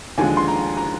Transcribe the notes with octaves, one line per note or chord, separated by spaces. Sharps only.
D#2 D3 F3 G#3 G#5
C6
A#5
A#5